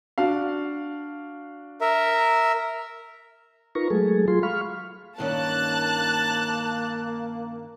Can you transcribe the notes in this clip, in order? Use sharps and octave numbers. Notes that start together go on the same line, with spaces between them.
D4 F#4 F5
A#4 E5
D#4 F4 A#4 B4 A#5 C#6
F#3 G#3 A3 G#4 A4
F#3 F4 G#4 C6
F5 B5 C#6 F6
G2 D#3 A#3 C#4 A5 F#6